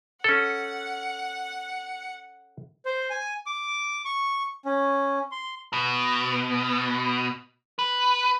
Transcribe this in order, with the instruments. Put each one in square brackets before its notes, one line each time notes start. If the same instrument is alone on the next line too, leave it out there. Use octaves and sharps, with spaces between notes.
[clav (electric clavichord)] C#4 A4 [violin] F#5
[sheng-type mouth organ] C5
G#5
D6
C#6
C#4
C6
[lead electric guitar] B2
B4